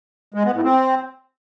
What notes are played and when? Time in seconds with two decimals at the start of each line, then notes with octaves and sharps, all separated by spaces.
0.34 G#3
0.44 B3
0.54 A2
0.64 C4